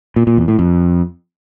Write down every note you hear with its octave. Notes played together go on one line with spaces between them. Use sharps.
A#2
A#2
E2
A2
F2